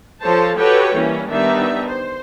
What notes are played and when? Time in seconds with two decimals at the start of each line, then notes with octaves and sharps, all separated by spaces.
0.21 F3 A4 C5 C#5 A5
0.56 F#4 G4 A4 B4 C#5 G5
0.94 E3 G3 A#3 C#4
1.30 D#3 G3 B3 D4 D#4 E5
1.88 C5